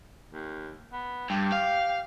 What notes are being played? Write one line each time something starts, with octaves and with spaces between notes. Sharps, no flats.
D#2
B3
G2 G4
F5